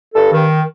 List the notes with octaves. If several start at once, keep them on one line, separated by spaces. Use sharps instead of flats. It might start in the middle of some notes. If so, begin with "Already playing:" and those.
G2 A4
D#3